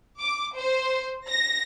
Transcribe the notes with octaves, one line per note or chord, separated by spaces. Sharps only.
D6
C5
A#6